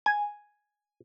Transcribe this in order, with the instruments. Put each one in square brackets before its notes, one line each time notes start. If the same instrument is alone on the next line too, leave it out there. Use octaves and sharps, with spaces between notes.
[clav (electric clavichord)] G#5